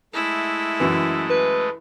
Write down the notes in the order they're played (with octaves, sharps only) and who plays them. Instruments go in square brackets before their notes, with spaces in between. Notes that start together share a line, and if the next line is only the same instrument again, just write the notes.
[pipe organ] G#3 A3 [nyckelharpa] E4
[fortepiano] F#2 E3
[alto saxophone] B4